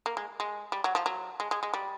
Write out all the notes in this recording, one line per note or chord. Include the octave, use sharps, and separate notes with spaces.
A#3
G#3
G#3
G3
F#3
F3
F#3
G#3
G#3
G#3
G3